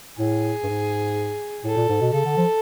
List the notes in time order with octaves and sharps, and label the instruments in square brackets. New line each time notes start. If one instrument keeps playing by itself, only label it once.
[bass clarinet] A2 [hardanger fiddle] G#4
[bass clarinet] G2
G#2
[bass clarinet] A2 [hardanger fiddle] A4
[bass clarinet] A#2
G#2
B2
[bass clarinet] C#3 [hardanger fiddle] A4
[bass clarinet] D3
F3